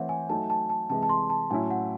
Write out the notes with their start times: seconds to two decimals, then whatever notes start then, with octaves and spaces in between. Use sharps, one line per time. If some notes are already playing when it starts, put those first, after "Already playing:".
Already playing: E3 A3 C4 C#5 E5 F#5
0.09 G#5
0.29 F#3 A3 D#4 A5
0.50 A5
0.69 A5
0.90 C3 E3 G#3 A5
1.03 A5
1.09 C6
1.30 A5
1.50 A2 F#3 C#4 E4 G#5
1.70 F#5